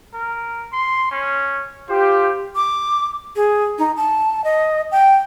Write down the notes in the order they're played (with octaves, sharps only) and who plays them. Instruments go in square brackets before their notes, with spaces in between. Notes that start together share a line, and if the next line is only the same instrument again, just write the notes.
[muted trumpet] A#4
C6
C#4
[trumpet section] F4 G4 [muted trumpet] C5
[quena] D6
G#4
D#4
A5
D#5
G5